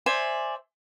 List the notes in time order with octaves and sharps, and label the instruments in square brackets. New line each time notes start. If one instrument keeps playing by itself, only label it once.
[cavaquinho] C5 D5 E5 G#5